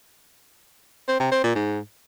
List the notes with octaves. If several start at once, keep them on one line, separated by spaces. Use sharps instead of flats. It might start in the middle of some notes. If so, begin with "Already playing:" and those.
C4
C3
C4
A#2
G#2